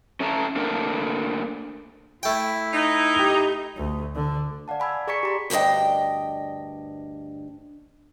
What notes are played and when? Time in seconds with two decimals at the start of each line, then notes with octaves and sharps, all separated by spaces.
0.20 C#4 A4 E5 A5 A#5
0.56 A3 A#3 D4 A4 A#4
2.23 A3 E4 G5
2.74 D#4
3.15 G4 G7
3.77 D2
4.15 D3
4.68 D5 F5 F#5 A5
4.80 G#5 B5 E6 G#6
5.07 G#4 D5 A#5 C#6 B6 C#7
5.23 G4 A#5 C6
5.50 D2 G2 D4 D#5 G5